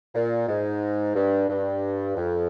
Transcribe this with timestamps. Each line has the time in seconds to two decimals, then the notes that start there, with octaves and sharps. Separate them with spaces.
0.15 A#2
0.48 G#2
1.16 G2
1.49 G2
2.16 F2